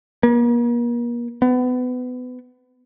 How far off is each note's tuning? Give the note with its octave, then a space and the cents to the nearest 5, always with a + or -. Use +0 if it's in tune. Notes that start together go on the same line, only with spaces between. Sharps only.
A#3 +40
B3 +25